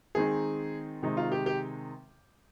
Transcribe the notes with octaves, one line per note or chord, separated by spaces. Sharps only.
D#3 G#3 C4 D#4 G#4
C3 D#3 G#3 C4 D#4
F4
G4
G4